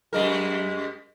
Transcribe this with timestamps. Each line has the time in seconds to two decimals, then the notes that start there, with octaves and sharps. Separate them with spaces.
0.13 F#2 G#3 A#4